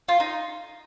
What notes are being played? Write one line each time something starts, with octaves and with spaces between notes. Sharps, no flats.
F4
D#4